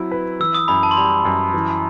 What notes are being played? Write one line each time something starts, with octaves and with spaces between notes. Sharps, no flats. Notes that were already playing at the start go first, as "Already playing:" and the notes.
Already playing: F#3 C4 E4
B4
E3 E6
D#6
F#2 B5
A5
C6
G3 B5
F#2
E3